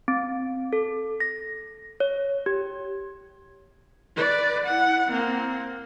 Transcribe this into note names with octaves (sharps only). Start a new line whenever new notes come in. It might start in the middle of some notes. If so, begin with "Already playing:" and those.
C4
A4
A#6
C#5
G4
B4 D5
E4 F#5
A#3 C4